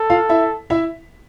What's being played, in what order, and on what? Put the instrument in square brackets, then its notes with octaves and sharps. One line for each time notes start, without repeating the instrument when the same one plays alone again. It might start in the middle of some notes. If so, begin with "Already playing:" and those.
Already playing: [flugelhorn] A4
[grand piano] F4 F5
E4 E5
E4 E5